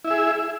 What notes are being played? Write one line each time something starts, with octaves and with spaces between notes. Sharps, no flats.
E4 G#4 E5